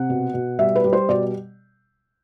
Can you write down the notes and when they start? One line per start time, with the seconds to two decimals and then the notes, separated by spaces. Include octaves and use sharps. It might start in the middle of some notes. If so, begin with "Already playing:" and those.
Already playing: C3 F#5
0.09 B2
0.34 B2
0.59 G3 E5
0.76 B4
0.84 G3
0.93 C5
1.09 B2 D5